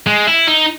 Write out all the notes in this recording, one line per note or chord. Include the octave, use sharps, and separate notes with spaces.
G#3
E4
D#4